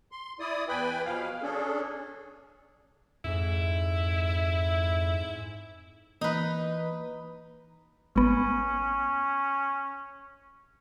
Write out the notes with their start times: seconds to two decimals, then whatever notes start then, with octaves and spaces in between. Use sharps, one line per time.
0.12 C6
0.40 E4 D5 D#6
0.68 E2 B4 G5 G#5 B5
1.05 B2 F3 F5
1.42 C#4 D4 G#4 A4
3.24 F2 G#2 E4
6.21 E3 A#3 D#4 B4
8.16 G#1 B3 C#4